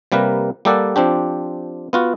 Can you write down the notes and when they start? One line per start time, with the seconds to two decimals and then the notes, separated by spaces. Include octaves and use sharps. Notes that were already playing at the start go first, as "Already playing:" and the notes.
0.12 C3 G3 A#3 A#4 B4
0.65 G3 A#3 G4 A4 D5 F#5
0.96 F3 C4 D4 G4
1.93 B3 F4 F#4